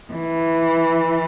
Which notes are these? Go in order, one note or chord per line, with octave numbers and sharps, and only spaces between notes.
E3